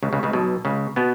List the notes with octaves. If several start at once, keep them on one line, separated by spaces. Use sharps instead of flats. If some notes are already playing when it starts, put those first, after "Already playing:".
C#2 C#3
C#2 C#3
C#2 C#3
B1 B2
C#2 C#3
B2 B3